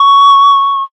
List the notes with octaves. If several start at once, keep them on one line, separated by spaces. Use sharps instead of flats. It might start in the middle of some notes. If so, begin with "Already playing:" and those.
Already playing: C#6